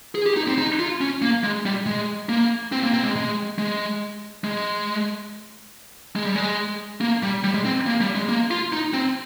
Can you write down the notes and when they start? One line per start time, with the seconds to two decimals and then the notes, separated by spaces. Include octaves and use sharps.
0.15 G#4
0.26 G4
0.37 D#4
0.48 C4
0.58 D#4
0.79 F4
1.01 C#4
1.22 A#3
1.44 G#3
1.66 G3
1.86 G#3
2.29 A#3
2.72 C4
2.83 A#3
2.94 C4
3.04 G#3
3.16 G#3
3.58 G#3
4.44 G#3
6.16 G#3
6.25 G3
6.36 G#3
7.01 A#3
7.23 G3
7.44 G3
7.54 G#3
7.65 C4
7.86 A#3
8.01 G3
8.15 G#3
8.29 A#3
8.51 F4
8.73 D#4
8.94 C4